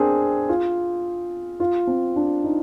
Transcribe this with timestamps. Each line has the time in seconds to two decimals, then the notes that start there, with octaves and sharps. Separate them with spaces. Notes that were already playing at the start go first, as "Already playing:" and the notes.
Already playing: C4 D4 G#4 A#4
0.49 F4
1.60 F4
1.87 C4
2.16 D4
2.44 D#4